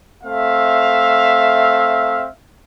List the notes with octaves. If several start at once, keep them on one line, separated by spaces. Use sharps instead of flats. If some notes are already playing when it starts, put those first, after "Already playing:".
A3 C4 E5 F5